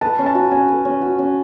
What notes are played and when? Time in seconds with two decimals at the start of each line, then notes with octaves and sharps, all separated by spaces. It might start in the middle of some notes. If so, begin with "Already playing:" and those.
0.01 B4 A5
0.19 C#4
0.26 A5
0.35 F#4
0.51 C#4 G#5
0.68 B4
0.85 C#4
1.02 F#4
1.19 C#4